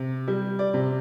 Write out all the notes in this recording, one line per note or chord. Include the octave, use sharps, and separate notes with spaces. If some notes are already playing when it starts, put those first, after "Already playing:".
Already playing: C3
G3
D5
C3